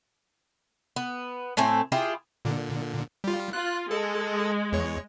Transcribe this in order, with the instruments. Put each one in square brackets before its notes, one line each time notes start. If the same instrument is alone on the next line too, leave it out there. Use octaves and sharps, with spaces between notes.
[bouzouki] B3
A2 A3 C4 G#5
E4 F4 G4 G#4
[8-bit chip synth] A#2 D3
G3 F4
[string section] F4 [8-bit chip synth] F#6
[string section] G#3 [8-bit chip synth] A4
[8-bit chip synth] E2 C#5